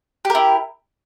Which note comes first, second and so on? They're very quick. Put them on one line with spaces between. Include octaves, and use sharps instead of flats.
G4 A#4 E4